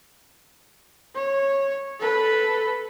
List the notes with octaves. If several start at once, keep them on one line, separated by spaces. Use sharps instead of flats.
C#5
A4 B4